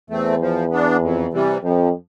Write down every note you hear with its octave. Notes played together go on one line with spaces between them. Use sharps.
E2 A3 C4
F3
B3 D4
F2
C3 E3 G3
F2 F3